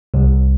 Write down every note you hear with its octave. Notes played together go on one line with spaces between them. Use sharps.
C2